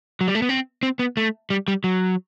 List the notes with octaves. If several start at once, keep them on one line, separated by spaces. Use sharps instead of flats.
F#3
G3
A3
B3
C4
C4
B3
A3
G3
G3
F#3